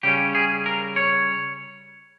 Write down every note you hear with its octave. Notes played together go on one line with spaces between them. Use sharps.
C#3 G3 C#4 G4
G#4
A#4
C#5